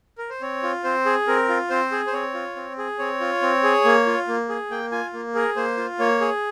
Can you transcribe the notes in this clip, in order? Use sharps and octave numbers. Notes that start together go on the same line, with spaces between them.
A#4
C5
C4 C#5
F4
C4 C5
G#4
C4 A#4
F4
C4 C5
G#4
C5
C4 C#5
F4
C4
G#4
C4 C#5
F4
C4
G#4
A#3
F4
A#3
G#4
A#3 G5
F4 G#5
A#3
G#4 A#4
A#3 C5
F4
A#3 C#5
G#4